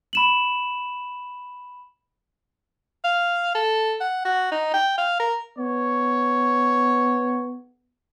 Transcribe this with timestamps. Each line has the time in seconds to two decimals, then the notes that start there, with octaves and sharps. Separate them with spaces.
0.13 B5 E7 F#7
3.04 F5
3.55 A4
4.01 F#5
4.25 F#4
4.52 D#4
4.74 G5
4.98 F5
5.20 A#4
5.58 B3 C#5